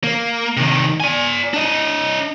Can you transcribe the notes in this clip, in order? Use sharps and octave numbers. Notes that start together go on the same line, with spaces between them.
A#3
C3 D#3
D5 G#5
D4 D#5